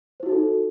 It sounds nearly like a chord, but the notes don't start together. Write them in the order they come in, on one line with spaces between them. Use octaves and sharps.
C5 E4 F#4 D#4 A4